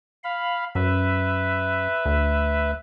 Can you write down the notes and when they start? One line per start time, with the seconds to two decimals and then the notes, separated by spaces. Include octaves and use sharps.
0.24 F5 B5
0.75 F#2 B4 E5
2.05 D2